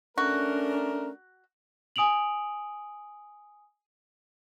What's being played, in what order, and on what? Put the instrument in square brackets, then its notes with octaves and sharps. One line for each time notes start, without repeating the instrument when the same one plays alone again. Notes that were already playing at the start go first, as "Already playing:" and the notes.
[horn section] A3 D4 A#4 [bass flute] C#4 [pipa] F#4
[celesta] G#5 D#6 D7 F7 F#7